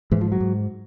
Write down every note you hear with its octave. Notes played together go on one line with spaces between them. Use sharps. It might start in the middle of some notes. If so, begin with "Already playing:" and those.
G#2 E3
F3
F#3
G#2